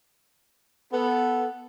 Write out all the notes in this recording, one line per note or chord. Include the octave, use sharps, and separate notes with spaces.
B3 A4